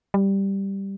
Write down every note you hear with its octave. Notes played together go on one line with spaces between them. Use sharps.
G3